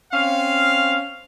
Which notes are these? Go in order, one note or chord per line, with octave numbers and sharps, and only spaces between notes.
C4 C#4 F5